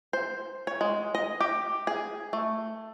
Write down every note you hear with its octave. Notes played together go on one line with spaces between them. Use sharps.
C5
C#5
G#3
D#5
G4
G#4
A3